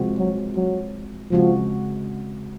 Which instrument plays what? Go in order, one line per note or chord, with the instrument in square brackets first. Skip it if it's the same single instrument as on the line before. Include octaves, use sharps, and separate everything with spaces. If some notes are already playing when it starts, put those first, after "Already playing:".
Already playing: [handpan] C3 F3 G#3 C4 F#4
[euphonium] F#3
F#3
[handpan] C#3 G#3 C4 F#4 [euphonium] F3